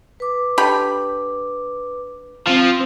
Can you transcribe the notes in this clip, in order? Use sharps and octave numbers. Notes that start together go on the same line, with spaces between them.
B4 D6
D3 G4 B5
F3 C4